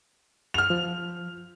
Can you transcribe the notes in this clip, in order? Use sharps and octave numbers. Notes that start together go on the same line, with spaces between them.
F6 F7
F3